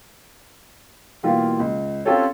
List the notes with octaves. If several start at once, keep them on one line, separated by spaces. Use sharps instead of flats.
B2 E3 G3 A#3 F4
C#2
C4 C#4 F4 G4 A4 C#5